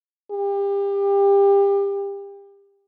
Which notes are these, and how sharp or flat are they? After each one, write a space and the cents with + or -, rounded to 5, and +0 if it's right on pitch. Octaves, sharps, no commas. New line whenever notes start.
G4 +30